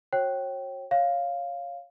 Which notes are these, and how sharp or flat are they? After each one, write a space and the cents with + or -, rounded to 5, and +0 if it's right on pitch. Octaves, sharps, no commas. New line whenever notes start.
F#4 -15 C#5 -35 G5 -20
C#5 +0 F5 +0